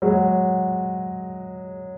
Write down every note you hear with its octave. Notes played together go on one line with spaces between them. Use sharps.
F#3 G#3